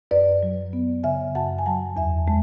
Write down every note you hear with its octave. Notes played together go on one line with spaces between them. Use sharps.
F#2 B4 D5
F#3
B3
C#3 E5 G#5
F#2 F#5 A5
G#5
F#3 F#5 A5
E2 E5 G#5
G#3 A5